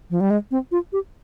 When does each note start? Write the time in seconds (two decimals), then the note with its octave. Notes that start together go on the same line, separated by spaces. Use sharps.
0.10 F3
0.20 G3
0.30 G#3
0.51 C4
0.72 F4
0.93 G4